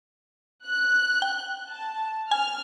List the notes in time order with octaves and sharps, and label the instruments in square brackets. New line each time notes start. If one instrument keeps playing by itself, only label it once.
[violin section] F#6
[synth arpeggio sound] G5
[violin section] A5
[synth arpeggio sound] G#5 [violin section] F6